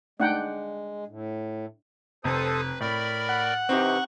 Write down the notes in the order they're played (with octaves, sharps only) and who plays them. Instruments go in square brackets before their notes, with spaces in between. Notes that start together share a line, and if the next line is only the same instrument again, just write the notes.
[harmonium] G#3 [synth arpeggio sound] A3 D#4 [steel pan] D4 F#5 G5
[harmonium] A2
[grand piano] F1 [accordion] A4 C5 D#6 [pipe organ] B4
[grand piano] A2 [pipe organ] A#4 D5 [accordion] B5
[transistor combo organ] F#5
[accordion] C3 E3 [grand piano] C4 D#4 G4 [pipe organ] C#6